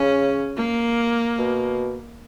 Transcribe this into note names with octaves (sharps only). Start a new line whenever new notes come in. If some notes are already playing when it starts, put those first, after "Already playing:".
Already playing: C#3 C#4
A#3
B2